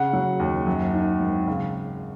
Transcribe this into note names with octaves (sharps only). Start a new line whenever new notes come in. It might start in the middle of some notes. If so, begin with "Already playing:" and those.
Already playing: C#3 F#5
F#3
D#2
F#2
D#3
G#1
C#3 F5